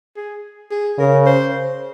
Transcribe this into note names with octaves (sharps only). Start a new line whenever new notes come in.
G#4
G#4
C#3 A#4
C5